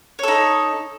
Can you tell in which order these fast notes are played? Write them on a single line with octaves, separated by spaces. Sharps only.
C#5 A4 D#4